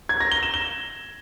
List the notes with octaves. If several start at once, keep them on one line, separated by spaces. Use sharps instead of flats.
G#6
A#6
G7
E7
G7